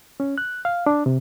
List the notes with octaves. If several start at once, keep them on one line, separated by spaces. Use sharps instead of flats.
C#4
F#6
F5
D4
C3